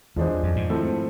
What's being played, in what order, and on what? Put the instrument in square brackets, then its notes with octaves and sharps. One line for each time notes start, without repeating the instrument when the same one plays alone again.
[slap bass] E2 [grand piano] F3 G#3 D4 G#4 C5
[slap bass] F2
G#2
[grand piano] F3 A3 C4 E4 A4